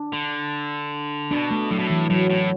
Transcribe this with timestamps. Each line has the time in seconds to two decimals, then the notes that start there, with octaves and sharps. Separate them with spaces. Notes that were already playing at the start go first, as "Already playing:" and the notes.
Already playing: D4
0.13 D3
1.31 B2 D4
1.51 A3
1.71 A2 F#3
1.79 B2
1.87 A2 E3
2.10 A2 F#3
2.30 A2